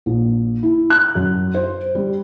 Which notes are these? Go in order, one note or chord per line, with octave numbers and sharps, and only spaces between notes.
A#1
E4
F#6
F#2
C5
G3